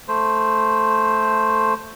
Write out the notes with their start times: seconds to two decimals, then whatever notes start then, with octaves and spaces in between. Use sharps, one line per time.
0.08 A3 C5